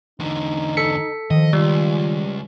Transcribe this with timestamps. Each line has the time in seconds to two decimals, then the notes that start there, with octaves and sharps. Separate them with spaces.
0.19 E2 D3 D#4
0.77 A4 B6 C#7
1.31 D#3 F3 D#5
1.53 C#2 G3 F4